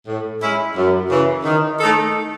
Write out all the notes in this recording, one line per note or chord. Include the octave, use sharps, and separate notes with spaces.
A2
G#3 C#4 E4
F#2
C#3 E3
D#3
A3 D#4 A4